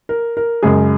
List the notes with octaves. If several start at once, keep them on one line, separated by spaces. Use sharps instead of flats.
A#4
A#4
F#2 C#3 G#3 G#4